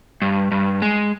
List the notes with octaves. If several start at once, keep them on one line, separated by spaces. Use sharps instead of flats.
G2
G2
G#3